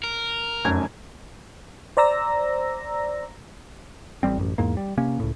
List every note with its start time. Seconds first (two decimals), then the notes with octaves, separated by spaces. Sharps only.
0.04 A#4
0.65 F1 F#2 G#6
1.97 C5 D5 A#5 E6 A#6
4.23 A1 G3 C4
4.38 A1 F#2
4.58 E2 G#2 A#3
4.77 G3
4.97 C3 A#3 C#4
5.20 C#2 A2